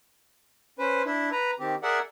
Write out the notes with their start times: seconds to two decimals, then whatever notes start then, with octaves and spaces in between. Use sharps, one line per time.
0.79 C#4 B4 C5
1.05 D4 E4
1.32 B4 A#5
1.59 D#3 C4 G4
1.83 G#4 A#4 D5 E5 F#5